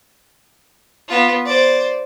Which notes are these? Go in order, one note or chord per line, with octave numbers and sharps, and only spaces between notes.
B3 F4
C5 D5